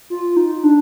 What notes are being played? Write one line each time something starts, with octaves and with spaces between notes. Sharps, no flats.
F4
D#4
D4